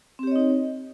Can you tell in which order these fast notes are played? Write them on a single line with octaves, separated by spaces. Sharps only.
C4 G4 C#5 D#5 D#4